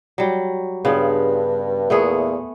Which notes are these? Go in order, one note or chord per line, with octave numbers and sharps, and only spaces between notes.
F#3 G3
G2 C#3 B3 F4
E2 A#2 A3 B3 G#4